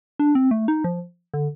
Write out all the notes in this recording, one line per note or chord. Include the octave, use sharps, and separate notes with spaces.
D4
C4
A3
D#4
F3
D3